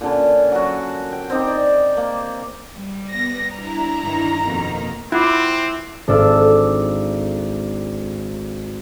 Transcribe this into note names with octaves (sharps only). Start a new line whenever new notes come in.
A#2 D3 C#4
F#3 F#4
G5
C4 D#4 G4
D5
A#3
G3
B3 A#6
D4 E4 A#5
G2 D#3 E3
F2 B2 D#3 A#3
C4 E4 F4 F#5 B5 D6 F#6
G#1 D4 A4 D5 E6 F6